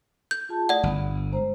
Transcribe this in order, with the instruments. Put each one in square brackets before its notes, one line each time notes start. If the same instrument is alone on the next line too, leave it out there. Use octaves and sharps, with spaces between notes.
[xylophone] G6
[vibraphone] F4 G#4 A5
[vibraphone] A3 E4 D#6 [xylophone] D5 F#5
[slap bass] G1 [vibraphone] B5
[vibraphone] G#3 C5 A#5